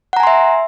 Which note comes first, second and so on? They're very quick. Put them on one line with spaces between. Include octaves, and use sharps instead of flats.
F#5 A#5 G#5 C6 E5